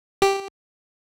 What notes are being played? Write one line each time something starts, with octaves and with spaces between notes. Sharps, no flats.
G4